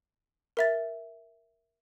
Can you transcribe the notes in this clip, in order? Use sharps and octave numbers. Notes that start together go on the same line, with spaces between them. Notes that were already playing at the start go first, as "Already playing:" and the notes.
A#4 E5 A6